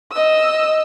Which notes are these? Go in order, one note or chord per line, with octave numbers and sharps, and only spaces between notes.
D#5 E6